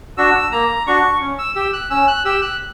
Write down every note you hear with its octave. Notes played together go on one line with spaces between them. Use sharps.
D4 F#4 E6
A#3 A#5
D4 F#4 C#6
C#4
E6
G4 E6
F#6
C#4 E6
F#6
G4 E6
F#6